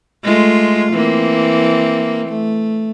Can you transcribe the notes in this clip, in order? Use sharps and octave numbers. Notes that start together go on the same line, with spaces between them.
G#3 A3 F4
E3 A#3 C4
A3